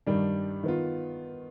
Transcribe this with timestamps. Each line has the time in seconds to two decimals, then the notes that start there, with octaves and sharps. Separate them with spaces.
0.06 G2 D#3 G3 D4
0.63 D#3 B3 F4